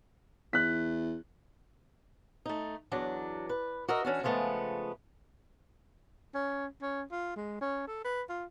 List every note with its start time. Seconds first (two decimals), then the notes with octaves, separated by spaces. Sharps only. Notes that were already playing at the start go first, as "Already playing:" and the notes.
0.53 E2 F#6 B6
2.46 A3 D#4
2.92 E2 F#3 D4
3.49 B4
3.88 F#4 A#4 D#5 E5
4.05 E3 C#4 D4 F#4
4.23 C#3 F3 G#3 A3 B3
6.34 C#4
6.82 C#4
7.11 F4
7.36 G#3
7.61 C#4
7.88 A4
8.05 B4
8.29 F4